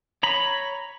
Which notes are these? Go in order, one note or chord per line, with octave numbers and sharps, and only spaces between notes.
C#5 A#5 B5